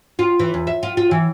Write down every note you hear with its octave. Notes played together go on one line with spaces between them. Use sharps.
F4
E3
E2
E5
F4
F4
E3